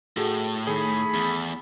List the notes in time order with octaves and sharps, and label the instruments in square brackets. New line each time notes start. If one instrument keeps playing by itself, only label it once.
[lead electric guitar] A2 [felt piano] F#4 G#4 A4
[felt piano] D#3 [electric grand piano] A3 G#4 [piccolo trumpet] B5
[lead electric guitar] E2